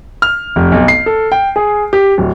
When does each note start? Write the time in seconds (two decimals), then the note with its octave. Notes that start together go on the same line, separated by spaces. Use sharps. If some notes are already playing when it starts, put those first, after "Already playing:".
0.22 F6
0.56 F1
0.72 B1
0.88 C7
1.06 A4
1.32 G5
1.56 G#4
1.93 G4
2.18 D1